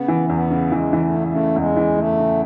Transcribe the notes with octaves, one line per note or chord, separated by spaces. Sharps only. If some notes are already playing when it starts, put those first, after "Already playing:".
Already playing: C#3 B3
E3
A3
E2 B3
C#3
E3 G#3
E3
A3
C#3
A3
C#3
E2 G#3
E3
C#3 A3
C#3